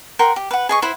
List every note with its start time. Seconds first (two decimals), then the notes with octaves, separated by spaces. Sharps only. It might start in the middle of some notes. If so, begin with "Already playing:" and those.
0.19 A#4 F#5 G5 C6
0.36 G4
0.51 B4 F#5
0.69 G#4 D#5 C#6
0.82 E4 C5 F#5 B5